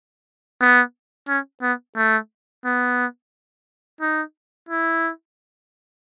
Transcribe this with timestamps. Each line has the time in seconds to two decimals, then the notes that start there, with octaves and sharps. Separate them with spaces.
0.60 B3
1.28 C#4
1.62 B3
1.96 A3
2.65 B3
4.01 D#4
4.69 E4